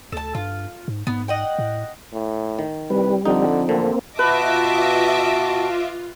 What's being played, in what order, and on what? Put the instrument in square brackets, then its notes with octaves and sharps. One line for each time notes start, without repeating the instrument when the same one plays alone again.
[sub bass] D2 [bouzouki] A4 A5
[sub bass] G2 [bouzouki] F4
[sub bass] G#2
[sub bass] G#2 [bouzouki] B3
[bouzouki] D#5 F#5 G5
[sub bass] A2
[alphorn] A2
[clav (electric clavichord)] D#3
[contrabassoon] C2 [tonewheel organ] G3 [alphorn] B4
[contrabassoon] F2 [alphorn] D3 [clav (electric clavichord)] D#4
[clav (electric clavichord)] A1 D3 [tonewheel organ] A#3 C4 [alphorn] A4
[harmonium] B2 F#4 A5 [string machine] F4 [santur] B4 [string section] D#5 E5 D6